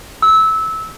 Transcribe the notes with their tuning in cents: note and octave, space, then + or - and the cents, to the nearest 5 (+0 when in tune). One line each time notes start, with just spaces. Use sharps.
E6 -20